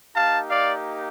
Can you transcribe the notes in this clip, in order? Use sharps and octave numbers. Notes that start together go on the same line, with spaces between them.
A#3 D#4 G4 F5 A5
D5 F5